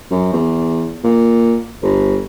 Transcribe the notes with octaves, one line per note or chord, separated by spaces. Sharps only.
F#2
E2
A#2
G1